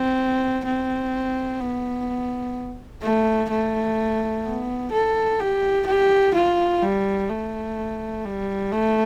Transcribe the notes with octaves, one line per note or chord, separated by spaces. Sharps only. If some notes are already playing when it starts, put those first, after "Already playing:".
Already playing: C4
C4
B3
A3
A3
B3
A4
G4
G4
F4
G3
A3
G3
A3